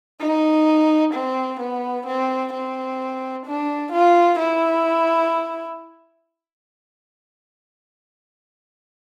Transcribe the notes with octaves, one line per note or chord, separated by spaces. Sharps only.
D#4
C4
B3
C4
C4
D4
F4
E4